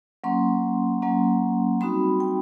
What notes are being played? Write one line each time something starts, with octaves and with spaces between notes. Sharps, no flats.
F#3 A#3 C#4 C6
F#3 A#3 C#4
G3 C4 D#4 F#4 B5
G5